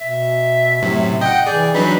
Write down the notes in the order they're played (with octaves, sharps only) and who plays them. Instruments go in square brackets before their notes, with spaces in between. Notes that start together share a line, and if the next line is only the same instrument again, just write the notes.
[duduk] B2 [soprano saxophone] E5
[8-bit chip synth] F#2 A2 [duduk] C3
[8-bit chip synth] D#5 F#5 [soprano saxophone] G5
[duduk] E3 [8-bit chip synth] G#4 [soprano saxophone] D5
[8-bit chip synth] F#3 D4 D#4 [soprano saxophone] B4